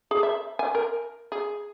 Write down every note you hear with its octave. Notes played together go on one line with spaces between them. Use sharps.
G#4
E5
G#5
A#4
G#4